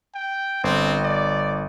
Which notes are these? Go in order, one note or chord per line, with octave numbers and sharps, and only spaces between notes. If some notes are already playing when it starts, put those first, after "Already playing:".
G5
G1 C4
D5